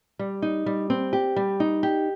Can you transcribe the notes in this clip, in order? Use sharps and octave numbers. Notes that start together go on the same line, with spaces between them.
G3
D#4
G3
C4
G4
G3
D#4
G4